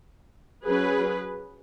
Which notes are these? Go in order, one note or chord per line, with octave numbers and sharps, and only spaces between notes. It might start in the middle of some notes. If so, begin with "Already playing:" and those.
F#3 C#4 G#4 B4